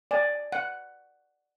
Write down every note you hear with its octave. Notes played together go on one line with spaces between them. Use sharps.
D5 G#5
F#5